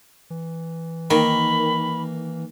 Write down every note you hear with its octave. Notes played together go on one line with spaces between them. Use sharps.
E3
D#3 A#3 B5